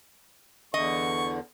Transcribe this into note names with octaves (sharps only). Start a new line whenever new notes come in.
E2 D3 D#5 C#6